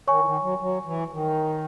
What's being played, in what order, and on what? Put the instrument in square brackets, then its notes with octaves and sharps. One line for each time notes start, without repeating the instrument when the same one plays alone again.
[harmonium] D#3 [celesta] C#5 G#5 C#6
[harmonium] E3
D#3
F#3
F#3
E3
D#3